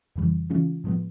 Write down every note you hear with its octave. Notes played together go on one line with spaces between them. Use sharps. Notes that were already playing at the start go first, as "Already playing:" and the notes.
F2 C#3 E3 G3
C#3 E3 G#3 C#4 F4
A2 F3 G#3 B3